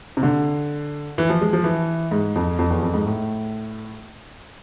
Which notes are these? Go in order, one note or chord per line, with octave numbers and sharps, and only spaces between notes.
C3
D3
E3
F3
G#3
F3
E3
G#2
F2
F2
E2
F2
G#2
A2